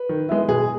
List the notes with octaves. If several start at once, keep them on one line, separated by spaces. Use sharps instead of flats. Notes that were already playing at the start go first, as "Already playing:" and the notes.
Already playing: B4
D#3
G#3 B3 E4
B2 G#4